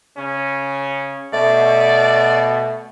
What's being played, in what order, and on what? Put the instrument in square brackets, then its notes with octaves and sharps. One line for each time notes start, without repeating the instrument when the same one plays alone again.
[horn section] C#3 C#4
[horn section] B2 [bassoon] A3 [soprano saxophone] D5